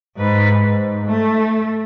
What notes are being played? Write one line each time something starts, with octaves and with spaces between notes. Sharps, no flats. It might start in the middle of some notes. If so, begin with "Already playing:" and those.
G#2 B4
G#2
A3